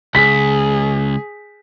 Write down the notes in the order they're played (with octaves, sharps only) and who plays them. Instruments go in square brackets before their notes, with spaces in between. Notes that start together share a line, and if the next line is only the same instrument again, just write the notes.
[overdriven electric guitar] C#2 [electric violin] G#4 [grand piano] B6